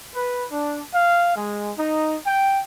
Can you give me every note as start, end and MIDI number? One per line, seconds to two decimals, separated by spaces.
0.14 0.46 71
0.51 0.82 62
0.94 1.34 77
1.35 1.71 56
1.78 2.17 63
2.26 2.61 79